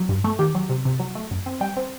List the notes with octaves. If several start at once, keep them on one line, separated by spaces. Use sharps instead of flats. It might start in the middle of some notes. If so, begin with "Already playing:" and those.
Already playing: F#3
G2
A3
D#3 G4
F#3
C3
C3
F#3
A3
F#2
C4
G3 G5
C4